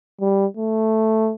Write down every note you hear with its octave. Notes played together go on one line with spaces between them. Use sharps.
G3
A3